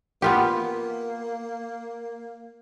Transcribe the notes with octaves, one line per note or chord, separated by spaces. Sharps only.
A#3 B3 F4 G4